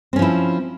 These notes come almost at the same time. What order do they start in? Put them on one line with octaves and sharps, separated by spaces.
C4 C#4 F3 E4